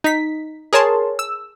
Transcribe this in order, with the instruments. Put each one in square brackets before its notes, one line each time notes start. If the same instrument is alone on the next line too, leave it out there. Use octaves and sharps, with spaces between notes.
[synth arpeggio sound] D#4 B6
G#4 A#4 C#5 A5 C6
E6